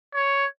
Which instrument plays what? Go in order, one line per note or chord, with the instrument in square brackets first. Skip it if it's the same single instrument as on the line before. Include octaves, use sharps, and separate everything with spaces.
[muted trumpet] C#5